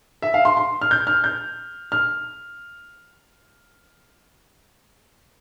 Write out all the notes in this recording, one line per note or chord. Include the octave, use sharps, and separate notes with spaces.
E5
F5
C6
C6
F6
G6
F6
G6
F6